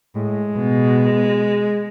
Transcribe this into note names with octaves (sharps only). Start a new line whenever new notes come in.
A2 G#3
B2